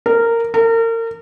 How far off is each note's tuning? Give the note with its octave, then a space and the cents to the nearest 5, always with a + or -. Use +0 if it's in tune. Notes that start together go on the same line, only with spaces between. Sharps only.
A#4 -15
A#4 -35